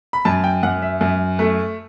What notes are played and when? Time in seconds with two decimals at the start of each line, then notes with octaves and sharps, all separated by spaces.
0.13 B5
0.25 F#2 A5
0.44 G5
0.63 F#2 F#5
0.82 E5
1.01 F#2
1.39 A3